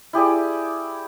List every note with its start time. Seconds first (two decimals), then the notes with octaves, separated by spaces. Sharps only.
0.13 E4 G4 G#4 D5